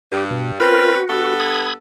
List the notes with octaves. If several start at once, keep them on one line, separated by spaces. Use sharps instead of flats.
G2 G4
B2
C4 C#4 F4 A#4 B4
F#4
G2 B3 A4
B5 D#6 G#6